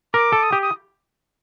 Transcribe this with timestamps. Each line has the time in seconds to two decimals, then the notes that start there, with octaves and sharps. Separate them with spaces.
0.14 A#4 D6
0.33 A4
0.43 D#6
0.52 G4
0.62 D#6